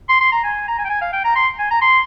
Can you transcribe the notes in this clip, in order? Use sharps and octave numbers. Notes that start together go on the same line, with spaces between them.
C6
C6
A#5
G#5
A#5
G#5
G5
G#5
F5
G5
A#5
C6
G#5
A#5
C6